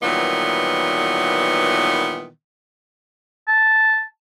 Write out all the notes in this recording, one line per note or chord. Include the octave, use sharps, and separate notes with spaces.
A#2 D#3 E3 F#3 G3 B3
A5